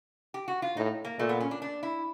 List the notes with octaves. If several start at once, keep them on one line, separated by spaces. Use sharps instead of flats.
G4
F#4
F4
A2 D#4
A#3
A#2 A3
B3
C#4
D4
D4
E4